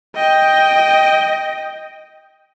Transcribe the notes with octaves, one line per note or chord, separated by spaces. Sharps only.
D#5 G5